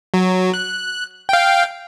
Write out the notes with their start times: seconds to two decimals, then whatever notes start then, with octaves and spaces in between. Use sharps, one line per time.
0.14 F#3
0.54 F#6
1.29 F5 G5